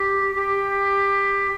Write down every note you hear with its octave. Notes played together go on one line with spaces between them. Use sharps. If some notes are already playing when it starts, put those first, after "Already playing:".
Already playing: G4
G4